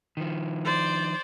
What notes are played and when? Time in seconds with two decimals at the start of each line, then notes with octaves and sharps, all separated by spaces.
0.17 D#3 F3
0.64 C5 D5